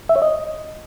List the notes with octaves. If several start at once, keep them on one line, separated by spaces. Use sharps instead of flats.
E5
C#5
D#5